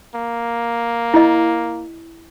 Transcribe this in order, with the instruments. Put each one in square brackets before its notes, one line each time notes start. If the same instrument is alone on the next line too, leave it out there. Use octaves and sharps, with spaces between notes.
[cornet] A#3
[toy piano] E4 D#5